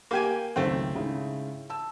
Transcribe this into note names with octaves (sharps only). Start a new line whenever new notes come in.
A#3 G4 G#5
G#1 C#2 F#2 A3 C4
G#2 C#3 E4
A5 E6